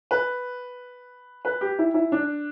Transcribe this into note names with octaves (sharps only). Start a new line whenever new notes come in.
B4
B4
G4
E4
E4
D4